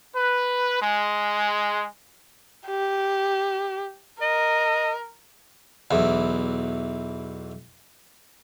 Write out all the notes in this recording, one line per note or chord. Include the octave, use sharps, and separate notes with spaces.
B4
G#3
G4
A#4 D#5
B1 E2 E3